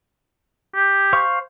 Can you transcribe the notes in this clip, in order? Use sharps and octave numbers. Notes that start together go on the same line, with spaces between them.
G4
C5 F5 C#6